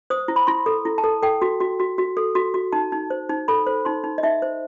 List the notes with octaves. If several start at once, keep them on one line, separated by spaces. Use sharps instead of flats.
C5 D#6
E4
B5
E4 C6
A4
E4
A5
A4
A4 G5
F#4
F#4
F#4
F#4
A4
F#4
F#4
D#4 A5
D#4
C5
D#4
A4 B5
C5
D#4 C6
D#4
D#5
D#4 E5
C5